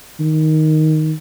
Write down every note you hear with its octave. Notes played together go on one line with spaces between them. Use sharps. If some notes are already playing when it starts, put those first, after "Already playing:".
D#3